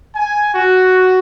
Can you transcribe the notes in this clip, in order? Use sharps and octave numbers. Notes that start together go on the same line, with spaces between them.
G#5
F#4